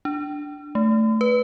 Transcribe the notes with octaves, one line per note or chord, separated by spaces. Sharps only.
D4
A3
B4